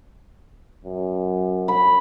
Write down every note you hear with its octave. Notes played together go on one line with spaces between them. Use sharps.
F#2
B5